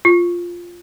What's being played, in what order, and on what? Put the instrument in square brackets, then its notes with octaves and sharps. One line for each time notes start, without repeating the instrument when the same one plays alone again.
[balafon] F4